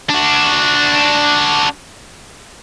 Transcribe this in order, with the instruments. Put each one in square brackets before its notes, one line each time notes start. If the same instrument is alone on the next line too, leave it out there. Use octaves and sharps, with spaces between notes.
[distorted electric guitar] D4 F#4